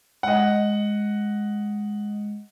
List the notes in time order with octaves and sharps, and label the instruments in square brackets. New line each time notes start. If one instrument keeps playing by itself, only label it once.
[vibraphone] G#3 [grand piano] D#5 F#5